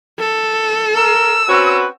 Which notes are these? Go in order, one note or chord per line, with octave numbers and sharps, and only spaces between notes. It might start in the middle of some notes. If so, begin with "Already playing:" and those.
A4
A#4 E6
C4 C#4 F#4 B4